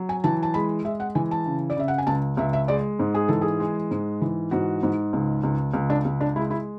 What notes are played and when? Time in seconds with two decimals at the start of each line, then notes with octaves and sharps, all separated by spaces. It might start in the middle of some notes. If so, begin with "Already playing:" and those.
Already playing: F#3
0.09 G#5
0.24 E3 A5
0.43 A5
0.54 G#3 B5
0.85 G#3 E5
1.00 F#5
1.15 E3 G#5
1.31 A5
1.46 C#3
1.70 D5
1.77 C#3 E5
1.88 F#5
1.98 G#5
2.07 C#2 A5
2.37 C#2 E5
2.53 E5
2.68 G#3 D5
2.99 G#2
3.14 G#4
3.28 E3 A4
3.41 G#4
3.60 G#3
3.91 G#2
4.21 E3
4.51 G#2 F#4
4.83 G#2
5.13 C#2
5.44 C#2
5.74 C#2
5.90 D4
6.05 C#2
6.21 D4
6.36 G#3 E4
6.51 E4